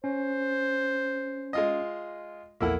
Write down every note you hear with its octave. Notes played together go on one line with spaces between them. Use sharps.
C#4 C5
G#3 F4 D#5
A#1 E2 A#3 E4 A4 F#5